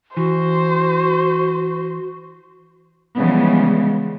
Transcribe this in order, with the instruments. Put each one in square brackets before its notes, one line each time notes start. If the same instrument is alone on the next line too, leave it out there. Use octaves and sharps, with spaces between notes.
[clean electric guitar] E3 [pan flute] F#4 [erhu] C5
[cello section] C#3 E3 F3 G3 G#3 B3